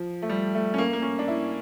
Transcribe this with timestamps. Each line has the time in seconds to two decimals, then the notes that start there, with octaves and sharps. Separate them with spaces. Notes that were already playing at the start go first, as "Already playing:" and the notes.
Already playing: F3
0.22 A3
0.29 G3
0.55 A3
0.74 C#4
0.78 A#3
0.93 A#3
1.02 C#4
1.19 D4
1.28 E4